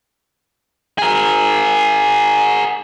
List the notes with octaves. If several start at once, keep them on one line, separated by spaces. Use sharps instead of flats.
G#4 A#4